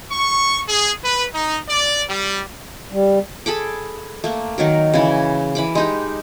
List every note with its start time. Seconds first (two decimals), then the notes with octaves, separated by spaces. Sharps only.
0.11 C#6
0.69 G#4
1.04 B4
1.34 D#4
1.69 D5
2.08 G3
2.92 G3
3.46 G#4 A4 B5 D6
4.24 A3 A#3
4.58 D#3 F#3 A#4
4.94 C#3 E3
5.55 E3 B5 D6
5.75 G#3 D#4 G4